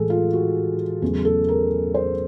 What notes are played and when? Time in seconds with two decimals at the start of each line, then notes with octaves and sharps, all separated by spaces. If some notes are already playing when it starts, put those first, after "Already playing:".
Already playing: A2 E3 G#3 G#4 A4
0.10 F4
0.33 F#4
1.02 E2 C#3 F#3 A3 G#4
1.25 A4
1.48 A#4
1.94 C5